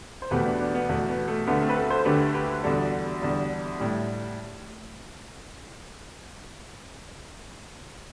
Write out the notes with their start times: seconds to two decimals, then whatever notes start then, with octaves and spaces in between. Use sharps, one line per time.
0.22 C5
0.31 E2 B2 A3 G4 B4
0.45 B3 D4
0.60 B3 D4
0.75 B3
0.89 E2 B2 A3
1.09 B3
1.28 A3
1.47 D2 D3 A3 B3
1.62 A3 C4
1.70 B4
1.76 F#4 A4
1.90 A4 C5
2.05 D2 D3 A3 G4 B4
2.34 G4 B4
2.63 E2 D3 G3 F#4 A4
3.22 E2 D3 G3
3.79 A2 G3